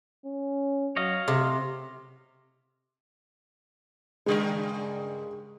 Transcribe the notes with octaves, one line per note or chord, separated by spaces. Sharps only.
C#4
F#3 C#5 D#5 F5
A2 C3
G2 C#3 G#3 A#4